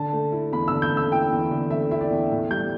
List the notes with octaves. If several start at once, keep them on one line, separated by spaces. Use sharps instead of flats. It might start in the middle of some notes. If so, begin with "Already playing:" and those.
Already playing: D3 A5
A3
E4
E2 B5
D3 E6
G6
A3
E6
E4 G5
E2
D3
A3 E5
E4 E5
D5
E2
A2
G3 G6